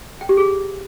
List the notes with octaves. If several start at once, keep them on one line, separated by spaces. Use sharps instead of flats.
G5
G4
G#4